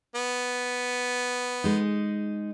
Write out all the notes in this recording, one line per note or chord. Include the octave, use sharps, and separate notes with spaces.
B3
G#3 D#4